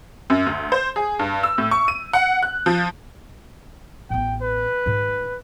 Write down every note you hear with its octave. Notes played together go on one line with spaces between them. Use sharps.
F#2
D2
C5
G#4
G2
E6
A2
C#6
D#7
F#5
F#6
F3
A1 B3 G5
B4
G#2 D#3